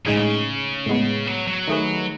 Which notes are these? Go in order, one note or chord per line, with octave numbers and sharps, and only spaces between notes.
A2 C#3 G#3 D#4 G#4
A2 G#3 B3
F#3
F#3
D#3 A3 D#4 G#4 B4